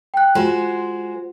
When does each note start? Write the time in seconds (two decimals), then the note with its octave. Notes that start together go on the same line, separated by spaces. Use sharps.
0.14 G5 F#6
0.35 G#3 F4 F#4 C5